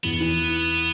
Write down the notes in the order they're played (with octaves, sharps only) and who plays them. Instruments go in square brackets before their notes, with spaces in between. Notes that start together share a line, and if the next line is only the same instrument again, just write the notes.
[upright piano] E2 [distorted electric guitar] B3
[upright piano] E3